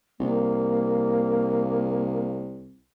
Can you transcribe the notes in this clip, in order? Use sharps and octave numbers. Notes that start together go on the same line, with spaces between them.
C2 A#3